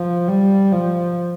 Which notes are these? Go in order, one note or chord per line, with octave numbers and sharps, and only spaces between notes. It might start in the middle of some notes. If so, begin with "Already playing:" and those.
Already playing: F3
G3
F3